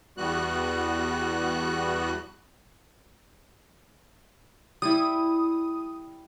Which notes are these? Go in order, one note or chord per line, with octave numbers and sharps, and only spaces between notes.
E2 G3 B3 F#4 F#6
G3 E4 D#6